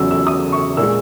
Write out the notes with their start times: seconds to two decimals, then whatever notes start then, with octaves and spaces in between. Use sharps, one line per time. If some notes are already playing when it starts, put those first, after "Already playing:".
Already playing: E2 C#3 F#3 E6
0.11 E6
0.27 D#6
0.52 C#6
0.77 A#2 G#3 E6